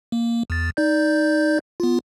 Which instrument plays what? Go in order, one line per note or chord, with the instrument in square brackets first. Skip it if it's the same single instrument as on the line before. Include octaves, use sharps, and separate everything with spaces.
[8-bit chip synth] A#3
E2 A6
D#4 D5 G6
B3 F4